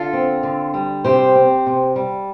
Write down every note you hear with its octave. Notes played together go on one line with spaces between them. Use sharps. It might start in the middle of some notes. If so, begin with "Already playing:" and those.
Already playing: D3 F4 A4
C4
D3
G3
C3 G4 C5
C4
C3
G3